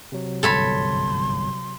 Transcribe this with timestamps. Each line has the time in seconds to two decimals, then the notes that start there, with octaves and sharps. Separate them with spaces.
0.12 C3 F#3
0.43 G1 C2 G#2 A4 C#5 B5 C6